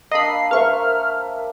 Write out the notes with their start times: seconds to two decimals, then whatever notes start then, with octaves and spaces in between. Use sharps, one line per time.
0.12 A#3 D4 D#5 B5 E6 C7
0.51 A#4 C5 E5 F5 C#6 F6